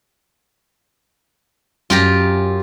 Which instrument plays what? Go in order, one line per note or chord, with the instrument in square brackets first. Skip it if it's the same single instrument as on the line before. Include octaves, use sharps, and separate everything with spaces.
[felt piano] F#2 [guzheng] F4 G4 A#5